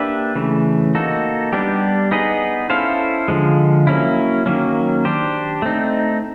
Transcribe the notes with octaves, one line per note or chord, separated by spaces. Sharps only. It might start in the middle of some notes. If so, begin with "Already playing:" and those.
Already playing: A#3 D4 G4 B4 E5
C#3 E3 A3
A#3 D#4 F#4 A4
G3 B3 D4 G4
B3 D#4 G#4 B4 D#5
C#4 E4 A4 C5 F5
D3 F3 G#3
F#3 A#3 C#4 E4
D#3 F#3 A#3 C#4
D4 G4 C5
A3 C4 D#4